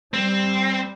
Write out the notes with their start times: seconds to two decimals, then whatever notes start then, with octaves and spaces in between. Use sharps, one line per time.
0.14 G3 C4